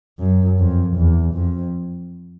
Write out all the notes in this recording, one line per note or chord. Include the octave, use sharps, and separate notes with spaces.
F#2
F2
E2
F2